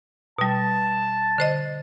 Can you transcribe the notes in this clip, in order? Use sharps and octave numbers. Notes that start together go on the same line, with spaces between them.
B2 G3 A5
D3 C5 D#5